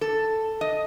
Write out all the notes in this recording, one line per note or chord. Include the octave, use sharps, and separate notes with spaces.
A4
D#5